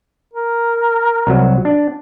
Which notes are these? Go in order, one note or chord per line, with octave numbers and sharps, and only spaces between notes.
A#4
C2 F#3
D4